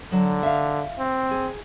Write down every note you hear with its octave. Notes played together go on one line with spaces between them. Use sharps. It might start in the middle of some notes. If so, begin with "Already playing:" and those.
D3 F#3
E5 F5
C4
G#4